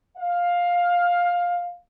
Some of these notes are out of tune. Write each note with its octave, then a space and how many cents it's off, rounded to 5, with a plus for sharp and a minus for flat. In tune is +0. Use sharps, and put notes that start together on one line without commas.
F5 +10